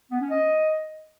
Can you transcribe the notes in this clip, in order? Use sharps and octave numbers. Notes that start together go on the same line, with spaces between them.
B3
C#4
D#5